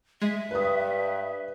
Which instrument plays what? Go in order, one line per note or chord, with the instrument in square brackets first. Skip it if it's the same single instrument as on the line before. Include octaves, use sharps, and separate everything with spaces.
[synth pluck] G#3 [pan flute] E5
[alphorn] G2 [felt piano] B4 D#6